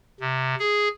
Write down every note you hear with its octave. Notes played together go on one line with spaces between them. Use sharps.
C3
G#4